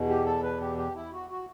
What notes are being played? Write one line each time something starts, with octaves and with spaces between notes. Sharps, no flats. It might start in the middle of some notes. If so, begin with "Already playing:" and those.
Already playing: E2 B2
G4
A4
B4
G4
G4
E4
F#4
F#4